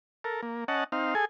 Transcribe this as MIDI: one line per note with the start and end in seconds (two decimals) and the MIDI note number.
0.24 0.41 69
0.24 0.41 70
0.42 0.64 58
0.68 0.84 61
0.68 0.84 75
0.68 0.84 78
0.68 0.84 81
0.92 1.14 60
0.92 1.14 63
0.92 1.14 77
1.15 1.25 68
1.15 1.25 69
1.15 1.25 80